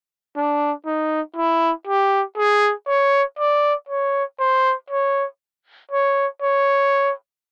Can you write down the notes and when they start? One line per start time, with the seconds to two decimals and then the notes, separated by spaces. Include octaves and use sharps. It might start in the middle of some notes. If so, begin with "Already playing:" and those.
0.37 D4
0.86 D#4
1.36 E4
1.87 G4
2.38 G#4
2.88 C#5
3.39 D5
3.89 C#5
4.40 C5
4.90 C#5
5.92 C#5
6.42 C#5